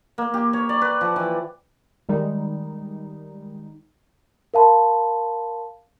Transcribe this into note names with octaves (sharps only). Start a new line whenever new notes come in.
A#3
G4
C#5
D5
B4
F3
E3
D#3 G3 G#3 D#4
A#4 F5 A5 B5 C6